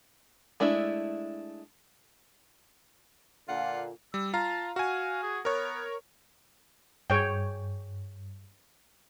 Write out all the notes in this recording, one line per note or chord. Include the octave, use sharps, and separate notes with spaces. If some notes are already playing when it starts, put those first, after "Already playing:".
G#3 A3 D4 E4
A#2 D3 F4 F5 F#5
G3 E6
F4 F5 A5 A#5
F#4 F5 G#5
G#4
B3 A#4 C#5
G2 G#4 C#5 G5